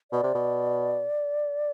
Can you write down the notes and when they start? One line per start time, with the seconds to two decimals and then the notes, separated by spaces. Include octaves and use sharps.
0.11 B2 D5
0.23 C3
0.35 B2